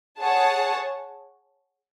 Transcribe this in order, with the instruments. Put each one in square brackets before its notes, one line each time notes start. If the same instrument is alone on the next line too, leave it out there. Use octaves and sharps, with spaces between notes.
[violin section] G#4 C#5 F#5 A5